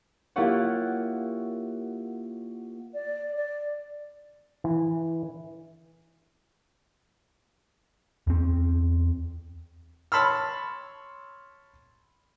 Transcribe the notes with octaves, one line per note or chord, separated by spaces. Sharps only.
A#3 E4 F4 G4 C#5 F#5
D5
D5
E3
E2 C4
C#5 A5 B5 C6 E6 F6